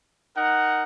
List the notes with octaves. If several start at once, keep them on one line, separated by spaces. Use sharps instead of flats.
D#4 A#4 F#5